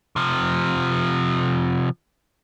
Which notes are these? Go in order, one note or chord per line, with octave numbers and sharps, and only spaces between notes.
C3 F3